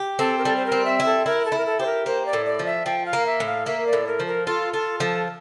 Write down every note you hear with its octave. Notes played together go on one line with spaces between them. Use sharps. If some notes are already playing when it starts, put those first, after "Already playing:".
Already playing: G4
C4 A4
A#4
G3 A4
C5
A#4
C4
E5
E4
A4
E4 A#4
A4
E4
A#4
A4
G4 C5
A#4
A#3 C5
D5
A2
D5
F3
E5
F3 G5
F5
A#3
E5
A2
F5
A#3 E5
D5
A2
A#4
F3
A#4
F4 A4
F4 A4
F3 A4